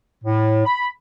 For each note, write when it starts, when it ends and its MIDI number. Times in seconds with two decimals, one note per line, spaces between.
0.24 0.63 45
0.65 0.88 83